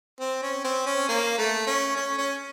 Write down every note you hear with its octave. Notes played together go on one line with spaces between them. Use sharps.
C4
C#4
C4
C#4
A#3
A3
C#4
C#4
C#4